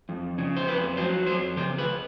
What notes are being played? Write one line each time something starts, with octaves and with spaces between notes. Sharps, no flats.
F2
C#3
C5
F2 B4
F#3 C5
F2 C5
C#3 C5
B4